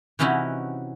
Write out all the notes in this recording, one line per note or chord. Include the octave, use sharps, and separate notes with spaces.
C3 E3 C#4 D#4 E4 F#4